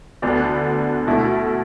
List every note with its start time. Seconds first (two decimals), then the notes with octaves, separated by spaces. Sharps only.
0.22 D2 D3 B3 D4
1.07 B2 A3 E4